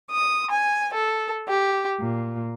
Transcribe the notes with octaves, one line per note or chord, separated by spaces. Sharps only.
D#6
G#5
A4
G4
A#2